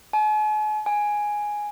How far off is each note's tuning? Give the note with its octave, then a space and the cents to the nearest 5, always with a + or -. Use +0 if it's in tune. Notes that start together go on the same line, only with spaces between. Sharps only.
G#5 +45
G#5 +0